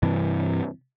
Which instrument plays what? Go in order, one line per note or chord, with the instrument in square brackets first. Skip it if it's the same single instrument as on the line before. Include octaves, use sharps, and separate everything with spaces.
[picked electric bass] G2 C3 E3